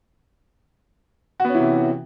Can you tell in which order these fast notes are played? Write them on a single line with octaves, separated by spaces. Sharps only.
F#4 B3 C#4 E3 C3